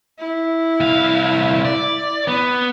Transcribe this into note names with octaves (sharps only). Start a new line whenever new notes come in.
E4
C2 F5
D5
B3